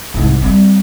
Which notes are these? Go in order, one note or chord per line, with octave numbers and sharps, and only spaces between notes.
C2 G#2
G3 C4